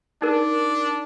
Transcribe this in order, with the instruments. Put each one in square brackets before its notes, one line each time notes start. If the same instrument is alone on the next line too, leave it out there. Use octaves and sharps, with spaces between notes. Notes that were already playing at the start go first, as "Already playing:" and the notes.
[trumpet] D4 [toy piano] D#4 A#4